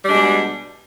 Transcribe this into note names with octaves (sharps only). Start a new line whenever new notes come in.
B2 G3 G#3 D4